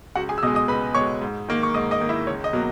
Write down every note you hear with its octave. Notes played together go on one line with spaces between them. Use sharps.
C#2 F#4 F#5
G#4 G#5
E6
B2 G#3 D#5 D#6
D#5 D#6
C#2 B4 B5
B2 G#3 C#5 C#6
G#2
D#3 A#3
C#6
G#2 D#5 D#6
D#5 D#6
D#3 A#3
E4 E5
C#2 C#5
D#5
B2 F#3 A#3